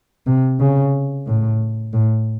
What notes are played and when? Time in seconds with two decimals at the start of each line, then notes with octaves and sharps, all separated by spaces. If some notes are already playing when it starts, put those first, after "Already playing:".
0.27 C3
0.60 C#3
1.26 A2
1.93 A2